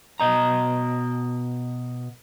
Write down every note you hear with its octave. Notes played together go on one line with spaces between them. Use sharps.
B2 D#5 A#5